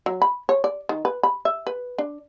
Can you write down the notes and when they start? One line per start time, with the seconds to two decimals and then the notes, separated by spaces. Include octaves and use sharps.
0.06 F#3
0.22 B5
0.49 C#5
0.64 D5
0.89 D#3
1.05 B4
1.23 B5
1.45 E5
1.67 B4
1.98 D4